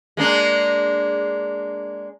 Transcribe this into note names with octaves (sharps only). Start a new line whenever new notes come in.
G#3 A#3 D4